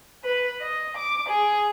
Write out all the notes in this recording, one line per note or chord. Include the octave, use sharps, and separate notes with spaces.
B4
D#5
D6
G#4